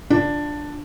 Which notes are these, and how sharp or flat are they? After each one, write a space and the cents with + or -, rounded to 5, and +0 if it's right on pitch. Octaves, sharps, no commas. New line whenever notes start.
D4 +5 F4 +5